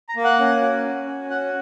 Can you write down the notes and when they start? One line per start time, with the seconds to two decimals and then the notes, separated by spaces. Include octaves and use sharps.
0.09 A#5
0.16 A#3
0.24 F#5
0.39 C#4
0.62 F#4
0.84 F#4
1.07 C#4
1.30 F#4 F#5